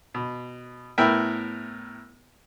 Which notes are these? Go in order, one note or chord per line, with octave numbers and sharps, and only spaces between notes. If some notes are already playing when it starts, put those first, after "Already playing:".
B2
A2 B3 E4 A#4 E5 G5